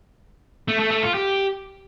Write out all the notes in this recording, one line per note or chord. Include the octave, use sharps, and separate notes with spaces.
A3
A3
A3
F4
G4